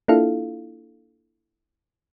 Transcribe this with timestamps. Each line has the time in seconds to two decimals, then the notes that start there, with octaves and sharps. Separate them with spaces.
0.08 A#3 D4 E4 F4 A4 F5